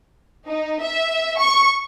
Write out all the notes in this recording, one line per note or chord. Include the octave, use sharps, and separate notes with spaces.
D#4
E5
C#6